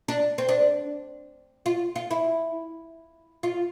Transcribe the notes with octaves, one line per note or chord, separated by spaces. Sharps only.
D4
C4
D4
F4
F4
E4
F4